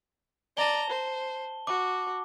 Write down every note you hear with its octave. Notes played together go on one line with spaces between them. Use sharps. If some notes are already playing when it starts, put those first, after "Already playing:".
D5 A5 A#5 G7
C5
F#4 D6